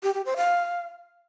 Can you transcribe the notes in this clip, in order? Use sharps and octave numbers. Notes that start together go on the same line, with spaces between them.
G4
G4
C5
F5